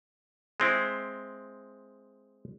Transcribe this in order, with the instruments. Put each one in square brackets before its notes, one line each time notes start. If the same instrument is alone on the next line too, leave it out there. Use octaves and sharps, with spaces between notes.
[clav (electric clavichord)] G#3 C4 E4